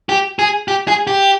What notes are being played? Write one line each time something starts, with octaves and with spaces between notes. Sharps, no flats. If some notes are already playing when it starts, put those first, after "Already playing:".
G4
G#4
G4
G#4
G4